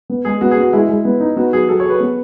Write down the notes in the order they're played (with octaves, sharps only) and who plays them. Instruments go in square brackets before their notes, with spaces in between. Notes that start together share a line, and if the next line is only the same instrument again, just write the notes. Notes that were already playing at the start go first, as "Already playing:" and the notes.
[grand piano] B3
[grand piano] G#3 [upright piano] G#4
[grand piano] B3 [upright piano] F#4
[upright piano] G#4
[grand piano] B3 [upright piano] F#4
[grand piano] G#3 [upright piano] E4
[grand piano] G#3
B3
D#4
[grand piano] B3 [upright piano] F#4
[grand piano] F#3 [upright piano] G#4
[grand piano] F#3 [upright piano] A4
[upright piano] C#5
[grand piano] G#4 [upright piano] B4
[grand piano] B3